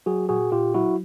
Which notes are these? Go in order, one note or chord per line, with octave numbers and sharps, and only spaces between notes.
F#3 F#4 G#4
A#2 F#4 G#4
A#2 F4 G4
F#3 E4 F#4